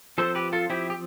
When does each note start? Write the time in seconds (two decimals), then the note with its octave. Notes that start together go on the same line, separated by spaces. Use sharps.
0.18 F3 C4 A4 C5
0.35 G4 B4
0.53 F4 A4
0.70 F3 C4 E4 G4
0.90 G4